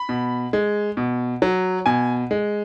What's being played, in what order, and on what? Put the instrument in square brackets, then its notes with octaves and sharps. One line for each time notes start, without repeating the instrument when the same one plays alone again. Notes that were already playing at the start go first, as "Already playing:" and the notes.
Already playing: [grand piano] B5
B2
G#3
B2
F#3
B2 G#5
G#3